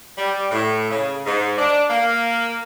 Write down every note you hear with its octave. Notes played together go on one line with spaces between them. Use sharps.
G3
A2
C#3
G#2
D4
A#3